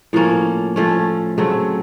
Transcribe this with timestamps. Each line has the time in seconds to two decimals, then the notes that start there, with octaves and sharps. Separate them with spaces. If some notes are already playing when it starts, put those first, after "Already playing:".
0.13 A2 F3 A#3 C#4
0.76 F3 A3 C#4
1.38 C#3 F#3 A3 C4